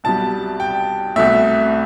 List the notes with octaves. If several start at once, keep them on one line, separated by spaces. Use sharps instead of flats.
C2 B2 G3 A5
G5
C2 B2 A3 E5